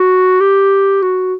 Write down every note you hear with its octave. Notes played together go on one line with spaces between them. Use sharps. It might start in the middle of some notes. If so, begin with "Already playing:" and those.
Already playing: F#4
G4
F#4